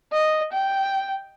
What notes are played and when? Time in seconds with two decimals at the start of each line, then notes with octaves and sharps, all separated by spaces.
0.12 D#5
0.53 G5